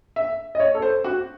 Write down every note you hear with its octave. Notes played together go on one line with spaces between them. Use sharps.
E5
D#5
C#5
A4
C5
F#4